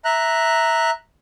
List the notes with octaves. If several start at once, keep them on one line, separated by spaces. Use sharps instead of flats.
E5 A#5 F#6